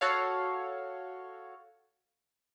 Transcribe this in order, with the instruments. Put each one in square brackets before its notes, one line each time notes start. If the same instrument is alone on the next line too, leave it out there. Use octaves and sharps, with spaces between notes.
[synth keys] F#4 A4 C#5 F5